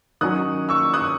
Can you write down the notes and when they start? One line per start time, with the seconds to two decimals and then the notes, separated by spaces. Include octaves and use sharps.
0.21 D#3 F#3 C#4 D#6 F#6
0.69 C#6 E6
0.94 D#6 F#6